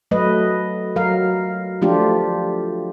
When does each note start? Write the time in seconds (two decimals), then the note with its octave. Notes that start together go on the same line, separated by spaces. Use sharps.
0.11 F#3 A3 B4 D#5
0.96 F#3 A#4 F5
1.82 F3 A3 D4 F4 G4